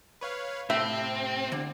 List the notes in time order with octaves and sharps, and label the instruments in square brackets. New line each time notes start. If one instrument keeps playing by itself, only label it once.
[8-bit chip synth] B4 C#5 F5
[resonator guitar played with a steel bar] A2 [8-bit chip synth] C3 [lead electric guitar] C4 [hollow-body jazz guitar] E5
[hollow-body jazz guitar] D3